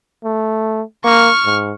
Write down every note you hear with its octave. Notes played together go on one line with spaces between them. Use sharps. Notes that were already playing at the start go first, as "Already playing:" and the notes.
A3
A#3 C#6 F6
G#2